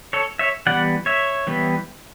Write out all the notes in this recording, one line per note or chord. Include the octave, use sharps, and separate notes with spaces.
A4 C#5
C#5 E5
E3 G3 B3 D5 F#5
C#5 E5
E3 G3 B3